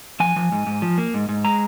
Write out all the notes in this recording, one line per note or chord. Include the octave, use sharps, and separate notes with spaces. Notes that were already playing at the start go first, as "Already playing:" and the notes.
F3 G#5
F3
G#2
G#2
F3
A#3
G#2
G#2
G#3 A#5